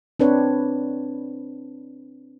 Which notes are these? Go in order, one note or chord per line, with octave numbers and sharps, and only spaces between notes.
C4 D4 B4 C#5